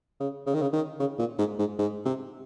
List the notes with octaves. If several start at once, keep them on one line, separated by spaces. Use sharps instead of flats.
C#3
C#3
D#3
C#3
D#3
C#3
A#2
G#2
G#2
G#2
C3